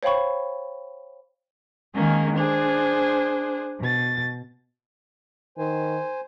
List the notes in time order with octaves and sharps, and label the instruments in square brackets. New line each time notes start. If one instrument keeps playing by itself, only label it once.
[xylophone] C5 C#5 F5 G5 B5 C#6
[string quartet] D#3 G#3 A#3 C#4 G#4
D4 G#4 C5
B2 A6
[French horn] D#3 [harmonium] C5 G#5